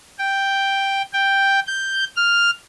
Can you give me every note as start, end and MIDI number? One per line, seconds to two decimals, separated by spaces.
0.19 1.02 79
1.13 1.60 79
1.67 2.04 91
2.16 2.50 89